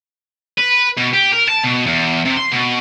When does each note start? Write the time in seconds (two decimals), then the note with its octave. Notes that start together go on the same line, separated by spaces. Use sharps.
0.58 B4
0.97 B2
1.13 G4
1.32 A#4
1.49 A5
1.64 B2
1.87 E2
2.25 C3
2.37 C6
2.51 B2